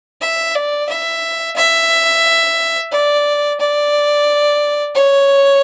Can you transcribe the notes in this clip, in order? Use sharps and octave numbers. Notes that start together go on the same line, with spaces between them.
E5
D5
E5
E5
D5
D5
C#5